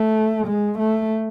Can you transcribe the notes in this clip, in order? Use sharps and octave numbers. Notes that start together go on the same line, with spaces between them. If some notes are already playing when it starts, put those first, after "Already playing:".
Already playing: A3
G#3
A3